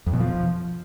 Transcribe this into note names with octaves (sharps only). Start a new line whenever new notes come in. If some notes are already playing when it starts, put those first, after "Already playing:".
F2
B2
F3